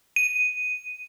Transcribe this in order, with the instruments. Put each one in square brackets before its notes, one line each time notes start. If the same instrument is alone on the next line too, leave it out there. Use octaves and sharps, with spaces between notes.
[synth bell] D#7